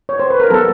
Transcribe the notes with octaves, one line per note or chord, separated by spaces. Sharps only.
C#5
C5
B4
A#4
F#3 B3 A4